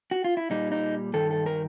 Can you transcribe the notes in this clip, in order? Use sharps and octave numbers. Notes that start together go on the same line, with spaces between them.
F#4
F4
E4
A#2 G3 D#4
D#4
G2 D#3 A4
A4
A#4